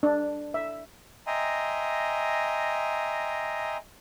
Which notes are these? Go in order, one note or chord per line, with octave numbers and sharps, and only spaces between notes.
D4
E5
D#5 E5 G5 G#5 A#5 C6